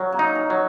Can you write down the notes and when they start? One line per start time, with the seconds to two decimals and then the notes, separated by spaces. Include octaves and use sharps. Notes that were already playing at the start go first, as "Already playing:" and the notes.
Already playing: F#3 C#4
0.12 A#3
0.19 D#4
0.35 C#4
0.50 F#3